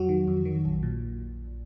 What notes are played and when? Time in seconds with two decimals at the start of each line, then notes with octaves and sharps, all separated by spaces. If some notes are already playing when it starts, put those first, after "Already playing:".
Already playing: F2 F#3 F#4
0.09 D#3
0.28 F2
0.45 D#3
0.65 A#1
0.83 A#2